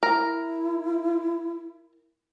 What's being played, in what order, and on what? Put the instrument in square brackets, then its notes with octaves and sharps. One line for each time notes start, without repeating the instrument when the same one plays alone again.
[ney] E4 [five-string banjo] A#4